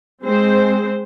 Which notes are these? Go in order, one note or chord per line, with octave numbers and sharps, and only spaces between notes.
G#3 C4 C5